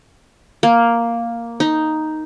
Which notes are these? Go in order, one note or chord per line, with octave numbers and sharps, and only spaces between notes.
A#3
D#4